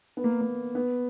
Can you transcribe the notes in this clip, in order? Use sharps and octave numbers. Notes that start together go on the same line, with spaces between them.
B3
A#3
A#3
B3